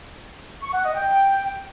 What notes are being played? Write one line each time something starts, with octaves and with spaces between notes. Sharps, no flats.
C#6
F#5
D#5
G5